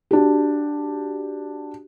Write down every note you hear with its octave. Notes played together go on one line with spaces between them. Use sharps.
D4 F#4 G4